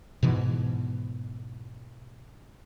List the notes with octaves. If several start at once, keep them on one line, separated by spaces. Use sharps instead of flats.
G#2 B2 E3